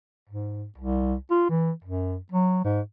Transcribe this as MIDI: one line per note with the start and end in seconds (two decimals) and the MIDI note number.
0.29 0.65 44
0.78 1.14 36
1.30 1.46 65
1.49 1.71 52
1.84 2.16 42
2.32 2.61 54
2.64 2.81 44